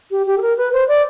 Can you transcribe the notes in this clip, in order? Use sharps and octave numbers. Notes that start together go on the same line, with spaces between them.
G4
G4
A4
A#4
B4
C5
D5